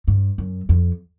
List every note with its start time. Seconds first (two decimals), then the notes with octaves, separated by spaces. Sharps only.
0.08 G2
0.38 F#2
0.69 F2